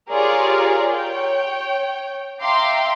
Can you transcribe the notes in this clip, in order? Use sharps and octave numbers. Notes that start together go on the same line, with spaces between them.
F4 G4 G#4 A#4 C#5 D5
C#5 G5
E5 F5 G5 A#5 C6 D6